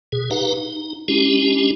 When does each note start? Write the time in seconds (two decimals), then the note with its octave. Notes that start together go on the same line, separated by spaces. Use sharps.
0.12 B2 G#4
0.31 D#4 G4 B4 F5 F#5 A#5
0.54 D#4
1.08 G#3 C#4 D4 E4 G4